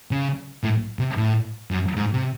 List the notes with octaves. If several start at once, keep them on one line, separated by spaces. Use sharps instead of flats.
C#3
A2
C3
A2
F#2
G#2
C3